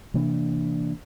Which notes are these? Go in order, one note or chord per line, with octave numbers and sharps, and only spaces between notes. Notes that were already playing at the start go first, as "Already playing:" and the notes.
C3 E3 A#3 D4